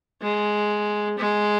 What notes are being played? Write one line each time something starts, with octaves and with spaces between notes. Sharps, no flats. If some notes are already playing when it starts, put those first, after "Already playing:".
G#3
G#3